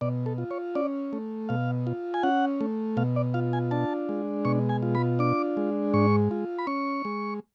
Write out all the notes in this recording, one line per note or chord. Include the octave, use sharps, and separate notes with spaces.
B2 D5
A4
F4
C#5
C#4 D5
A3
B2 F5
F4
G#5
C#4 F#5
A3
B2 F5
D5
F4 F5
G#5
D4 A5
G#3
B2 C#6
G#5
F4
B5
D4 D6
G#3
G#2 C#6
F4
B5
C#4 C#6
G#3